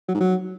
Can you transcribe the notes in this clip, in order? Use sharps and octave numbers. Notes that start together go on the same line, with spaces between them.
F#3
G#2
F#3